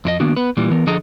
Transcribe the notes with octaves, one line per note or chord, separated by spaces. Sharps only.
F2 E4 D#5
D#3 A#3 B3 D4 F#4
B3 B4
A#2 E3 G3
E3 B3 A#4
D3 F3 G#4 A4 D#5 A#5